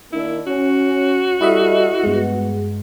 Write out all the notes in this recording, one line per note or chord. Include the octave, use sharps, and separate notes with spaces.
D#3 A#3 D4 E4
C#4 F#4
G3 E4 A4 D#5 E5
G2 G#3 B3